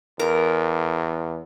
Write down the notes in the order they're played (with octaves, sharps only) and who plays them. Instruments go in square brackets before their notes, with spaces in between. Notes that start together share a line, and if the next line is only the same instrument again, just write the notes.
[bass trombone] E2 [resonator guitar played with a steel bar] A#4